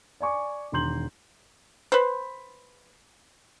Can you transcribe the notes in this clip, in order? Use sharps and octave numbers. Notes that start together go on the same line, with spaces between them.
D5 G#5 C#6 D6
E1 D#3 A#5 C6 G6 F#7
B4 C5